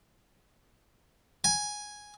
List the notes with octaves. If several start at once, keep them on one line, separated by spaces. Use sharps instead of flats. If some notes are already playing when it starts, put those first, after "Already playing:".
G#5